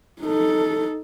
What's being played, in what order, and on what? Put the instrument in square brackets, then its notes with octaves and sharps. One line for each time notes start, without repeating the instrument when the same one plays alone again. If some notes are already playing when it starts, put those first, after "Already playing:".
[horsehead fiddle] D#4 A4